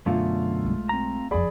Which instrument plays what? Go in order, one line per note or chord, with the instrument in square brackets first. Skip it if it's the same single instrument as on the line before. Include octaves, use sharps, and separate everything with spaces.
[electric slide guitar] F#2 B2 D3 [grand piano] A3 F4 F5
[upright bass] B1 G#3
[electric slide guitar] C4 A#5
[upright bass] F#1 F2 [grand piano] G#4 D5 B5